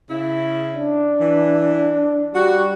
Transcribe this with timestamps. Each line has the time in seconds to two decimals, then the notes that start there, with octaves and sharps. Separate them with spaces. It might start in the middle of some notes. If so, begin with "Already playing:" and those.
0.10 C#3 E4
0.74 D4
1.19 E3
2.35 G3 F#4